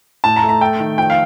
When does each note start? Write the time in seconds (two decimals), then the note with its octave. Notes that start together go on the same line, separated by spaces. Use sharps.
0.24 A2 A5
0.36 A#5
0.43 A3
0.49 A#5
0.61 A3 G5
0.80 D#3
0.98 F3 G5
1.10 F5